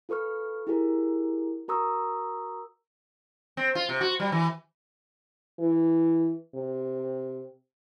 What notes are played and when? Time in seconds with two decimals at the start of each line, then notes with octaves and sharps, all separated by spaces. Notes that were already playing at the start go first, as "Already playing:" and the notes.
0.09 F4 A4 B4 C#6 F6
0.67 E4 G4 G#4 A#4
1.68 F#4 A#4 A#5 C#6 D#6 E6
3.57 C4
3.75 F4
3.89 C3
4.01 F#4
4.20 G3
4.32 E3
5.60 E3
6.55 C3